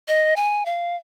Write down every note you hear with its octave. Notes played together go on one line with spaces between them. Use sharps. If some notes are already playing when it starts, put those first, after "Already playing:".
D#5
G#5
F5